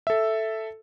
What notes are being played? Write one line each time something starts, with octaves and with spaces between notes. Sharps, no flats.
A4 E5